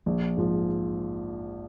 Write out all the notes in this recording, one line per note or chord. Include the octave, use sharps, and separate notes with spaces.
A#1
G#2 F3